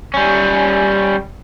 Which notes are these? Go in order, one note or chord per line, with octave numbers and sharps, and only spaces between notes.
G3 C#4